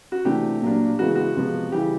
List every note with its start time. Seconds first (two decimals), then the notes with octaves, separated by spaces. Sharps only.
0.12 F#4
0.25 C3 E3 A3 D4 G4
0.62 A#2 F#3 A#3 D4
0.99 C#3 E3 G#3 B3 F#4
1.15 F#4
1.36 C3 F3 G#3 B3
1.72 C#3 E3 G3 G4